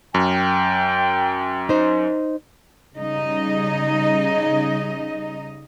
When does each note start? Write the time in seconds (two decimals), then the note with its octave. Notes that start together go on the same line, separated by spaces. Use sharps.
0.14 F#2 G5
1.69 D#4 C5
2.95 C#3 G3 D#4 D#5